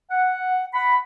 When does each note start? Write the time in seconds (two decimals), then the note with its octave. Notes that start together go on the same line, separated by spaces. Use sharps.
0.11 F#5
0.73 F#5 B5